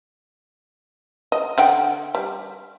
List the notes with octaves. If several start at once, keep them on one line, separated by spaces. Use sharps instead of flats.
D#5
D3 F#5 G5
G3